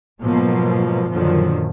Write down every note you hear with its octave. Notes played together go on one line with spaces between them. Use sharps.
G#2 B2 F3 F#3 A#3
F#2 A#2 D3 D#3 F3 F#3